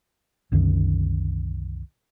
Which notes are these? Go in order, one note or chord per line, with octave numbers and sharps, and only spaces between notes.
C2 F#2 D3 D#3